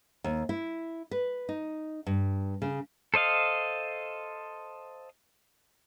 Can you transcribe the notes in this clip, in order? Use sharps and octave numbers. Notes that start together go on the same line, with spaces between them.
D#2
E4
B4
D#4
G2
C#3
A4 C5 D#5 F5